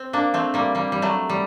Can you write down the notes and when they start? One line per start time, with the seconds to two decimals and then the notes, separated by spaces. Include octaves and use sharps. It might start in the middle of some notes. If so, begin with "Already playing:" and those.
Already playing: C4
0.13 A#3 D4
0.34 A3 C4
0.54 G3 A#3
0.75 G3 A#3
0.92 G3
1.02 F#3 A3
1.29 G3